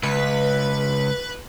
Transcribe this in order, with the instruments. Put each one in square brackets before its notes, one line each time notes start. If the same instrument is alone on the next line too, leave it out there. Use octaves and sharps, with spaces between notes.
[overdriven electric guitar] C#2 [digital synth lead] B4